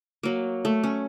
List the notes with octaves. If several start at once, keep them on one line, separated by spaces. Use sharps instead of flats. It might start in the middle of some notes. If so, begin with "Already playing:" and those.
F#3 A#3
A3
C#4